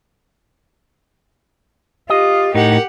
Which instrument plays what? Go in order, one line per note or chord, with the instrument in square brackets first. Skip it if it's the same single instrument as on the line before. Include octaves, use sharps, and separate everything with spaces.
[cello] F4 [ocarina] G4 [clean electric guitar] D#5
[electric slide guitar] A2 D#4 [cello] G4 F#5 [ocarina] A#4